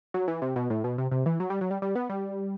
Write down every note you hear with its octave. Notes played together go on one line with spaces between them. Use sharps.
F#3
E3
C3
B2
A2
B2
C3
C3
E3
F#3
G3
F#3
G3
G3
B3
G3